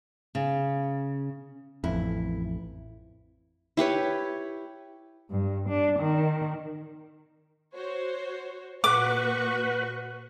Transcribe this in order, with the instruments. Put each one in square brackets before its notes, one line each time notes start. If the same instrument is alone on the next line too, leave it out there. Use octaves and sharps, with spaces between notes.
[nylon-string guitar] C#3
[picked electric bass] A1 F2 [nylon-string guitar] E4
[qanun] E4 G4 B4 C#5
[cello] G2
D4
D#3
[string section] F#4 C5 C#5
[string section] A#2 F#4 C#6 [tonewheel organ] B4 [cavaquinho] D6